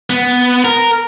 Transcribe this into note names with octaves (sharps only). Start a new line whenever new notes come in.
B3
A#4